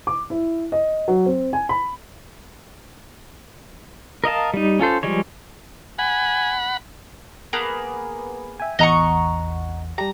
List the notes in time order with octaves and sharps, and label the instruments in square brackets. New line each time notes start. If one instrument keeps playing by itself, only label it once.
[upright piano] D6
E4
D#5
F#3
C4
G#5
B5
[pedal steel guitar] A#4 D#5 F5 A5
G3 D#4
C#4 F4 A4 C5
F3 G3 G#3 C#5
[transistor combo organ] F#5 B5 [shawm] G#5
[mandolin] A#3 B3 G#4
[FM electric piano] E5 G5 G#5
[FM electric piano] A1 E2 F#5 [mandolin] D#5 A#5 C#6
[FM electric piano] G3 G4 [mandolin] A#5